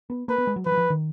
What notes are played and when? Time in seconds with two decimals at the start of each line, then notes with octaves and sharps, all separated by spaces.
0.10 B3
0.28 A#3 B4
0.38 B3
0.47 G#3
0.56 F#3
0.66 F3 B4
0.72 F#3
0.77 F3
0.90 D#3